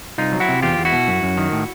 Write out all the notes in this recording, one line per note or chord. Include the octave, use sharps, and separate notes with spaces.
C2 D#4 F4
F#3
E4 F#4
C3
E2 F4 G4
E2
E4 F#4
B2
F#2
F#2
D#3
A2